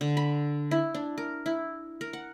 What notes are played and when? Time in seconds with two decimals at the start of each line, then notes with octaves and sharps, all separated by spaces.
0.01 D3
0.17 B5
0.71 E4
0.95 D4
1.18 A#4
1.46 E4
2.01 A#4
2.13 F#5